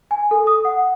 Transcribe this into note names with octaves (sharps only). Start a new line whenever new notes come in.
G#5
A4
D#6
F#5